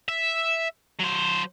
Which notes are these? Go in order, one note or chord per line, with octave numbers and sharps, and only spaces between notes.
E5
F#3 C5